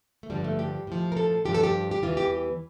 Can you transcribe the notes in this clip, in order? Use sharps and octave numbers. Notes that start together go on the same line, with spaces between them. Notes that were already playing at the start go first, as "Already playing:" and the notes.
A3
G2 D3 F3 G3
A3
G4
A2 F3
A#4
A4
G2 F3 G4
A4
G4
G4
E2 E3 F4
G4